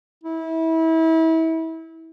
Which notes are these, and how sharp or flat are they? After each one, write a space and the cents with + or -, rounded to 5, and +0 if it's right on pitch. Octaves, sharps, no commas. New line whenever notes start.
E4 -30